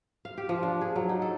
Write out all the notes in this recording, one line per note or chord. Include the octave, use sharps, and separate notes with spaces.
F5
G4
F3
D4
G#4
F#3
D#4
A4